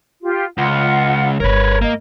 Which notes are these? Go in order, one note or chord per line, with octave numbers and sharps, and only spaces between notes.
F4 G4
C#2 F4 F#5
D1 G1 A#4 B4 C#5
A#3 D#5